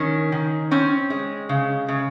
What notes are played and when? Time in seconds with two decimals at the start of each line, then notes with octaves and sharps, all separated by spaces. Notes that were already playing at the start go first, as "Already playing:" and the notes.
Already playing: D#3 C#4
0.32 D#3
0.71 C4 C#4
1.10 G#3
1.49 C#3
1.88 C#3